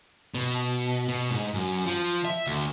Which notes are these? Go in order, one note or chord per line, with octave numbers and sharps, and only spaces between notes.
B2
B2
G#2
F#2
F3
E5
D2